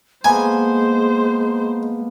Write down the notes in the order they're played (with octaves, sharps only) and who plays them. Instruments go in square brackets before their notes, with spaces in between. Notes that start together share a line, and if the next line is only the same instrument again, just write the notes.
[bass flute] G#3 [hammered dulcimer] A#3 B3 A4 [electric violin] C5 [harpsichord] G#5